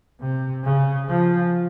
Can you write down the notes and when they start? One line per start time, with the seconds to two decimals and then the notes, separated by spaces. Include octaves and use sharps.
0.20 C3
0.64 C#3
1.09 F3